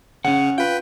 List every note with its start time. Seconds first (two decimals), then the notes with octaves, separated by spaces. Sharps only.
0.25 C#3 C#4 F#5
0.58 F4 B4 G5